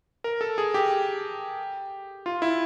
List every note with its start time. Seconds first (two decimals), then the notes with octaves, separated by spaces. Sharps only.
0.24 A#4
0.41 A4
0.58 G#4
0.74 G4
2.26 F4
2.42 E4